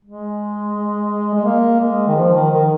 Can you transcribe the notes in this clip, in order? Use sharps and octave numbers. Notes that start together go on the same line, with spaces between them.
G#3
G#3
A#3
G#3
D#3
F3
D#3
D#3